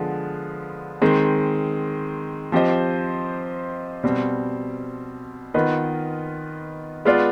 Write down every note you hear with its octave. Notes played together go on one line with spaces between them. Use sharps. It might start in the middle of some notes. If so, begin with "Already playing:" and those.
Already playing: D3 F3 G#3 B3
D#3 G#3 C4
F3 C4 G4 C5 D#5
B2 G3 C4
D#3 B3 F4 B4 D#5
G#3 B3 F4 B4 D5